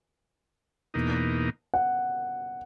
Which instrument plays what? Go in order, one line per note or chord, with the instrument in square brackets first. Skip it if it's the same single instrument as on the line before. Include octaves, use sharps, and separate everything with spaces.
[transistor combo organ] E2 B2 A#3 D#4
[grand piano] F#5